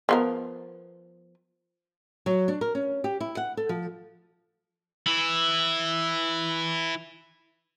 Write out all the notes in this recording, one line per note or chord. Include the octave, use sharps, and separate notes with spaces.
F3 B3 A#4
F#3
D4
A#4
C#4
G4
E4
F#5
A4
F3
E3 E4